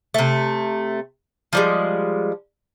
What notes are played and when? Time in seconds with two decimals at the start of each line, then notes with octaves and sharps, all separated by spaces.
0.14 C3 A3
1.53 F3 G3 G#3